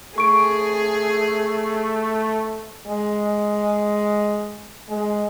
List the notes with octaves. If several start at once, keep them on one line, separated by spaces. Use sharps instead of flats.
A3 G#4 C#6 D7
G#3
G#3